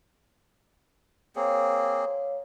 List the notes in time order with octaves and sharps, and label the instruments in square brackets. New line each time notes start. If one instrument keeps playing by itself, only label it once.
[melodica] A#3 C4 G#4 [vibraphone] C#5 F5